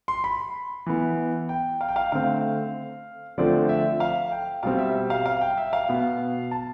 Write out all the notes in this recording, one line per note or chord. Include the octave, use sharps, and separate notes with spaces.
C6
B5
E3 B3
G5
F5
G5
F5
D3 A3 C4 F5
D3 F3 A3 C4 D5
E5
F5
G5
B2 G3 C4 F5
E5
E5
F5
F5
G5
E5
F5
B2 B3
A5